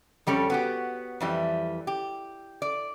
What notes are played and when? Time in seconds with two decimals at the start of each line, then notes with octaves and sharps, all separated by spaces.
0.27 F2 G3 C#4 A4
0.50 B3 F#4 G4
1.20 F2 E3 G3
1.87 G4
2.62 D5